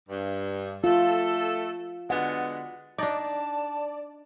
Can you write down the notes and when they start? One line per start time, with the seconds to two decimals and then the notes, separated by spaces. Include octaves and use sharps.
0.09 G2
0.84 A3 F4 A4
2.10 D3 G#3 B3 F#5
2.98 D4 D#4 D5 A5